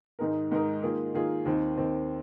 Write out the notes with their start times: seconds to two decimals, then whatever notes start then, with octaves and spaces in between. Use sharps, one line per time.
0.19 G#2 D#3 G#3 D#4 A#4
0.52 G#2 D#3 G#3 D#4 A#4
0.83 D#3 A#3 F4 G#4
1.15 D#3 A#3 F4 G#4
1.46 D#2 D#3 C4
1.78 D#2 D#3 C4